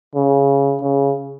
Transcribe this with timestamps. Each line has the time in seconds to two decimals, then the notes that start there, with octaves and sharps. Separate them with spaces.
0.15 C#3
0.82 C#3